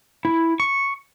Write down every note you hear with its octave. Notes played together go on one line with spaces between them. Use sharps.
E4
C#6